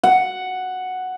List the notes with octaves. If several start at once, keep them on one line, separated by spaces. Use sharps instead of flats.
F#5